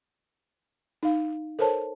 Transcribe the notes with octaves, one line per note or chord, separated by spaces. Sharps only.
D#4 F5
A4 A#4 C5 C#5 A5